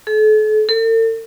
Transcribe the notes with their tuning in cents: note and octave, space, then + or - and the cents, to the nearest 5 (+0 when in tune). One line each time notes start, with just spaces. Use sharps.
A4 -40
A4 +45